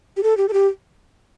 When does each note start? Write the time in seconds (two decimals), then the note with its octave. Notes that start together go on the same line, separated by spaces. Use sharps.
0.17 G4
0.23 A4
0.37 G4
0.48 A4
0.53 G4